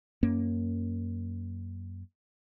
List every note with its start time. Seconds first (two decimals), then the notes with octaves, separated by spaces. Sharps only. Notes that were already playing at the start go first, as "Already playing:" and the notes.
0.23 F#2 A#3 C#4